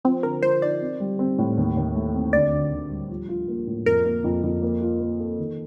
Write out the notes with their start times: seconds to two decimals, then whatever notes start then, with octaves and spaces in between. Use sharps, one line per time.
0.04 F3 C4
0.23 D3 A#4
0.43 F3 C5
0.62 D#4 D5
0.81 C4
1.00 G3
1.19 C4
1.38 A2
1.57 D#2
1.77 D#2
1.95 A3
2.14 C4
2.33 D2 D5
2.52 D2
2.72 D2
2.90 G3
3.10 F3
3.29 F4
3.48 A#3
3.67 A2
3.86 F2 A#4
4.05 A#3
4.24 F2
4.43 F2
4.62 A#3
4.81 F4
5.00 A#3
5.20 A4
5.39 D#3